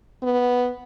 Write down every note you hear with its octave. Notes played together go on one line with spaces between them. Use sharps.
B3